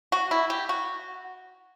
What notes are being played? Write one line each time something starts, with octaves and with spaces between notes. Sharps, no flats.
F#4
E4
G4
F#4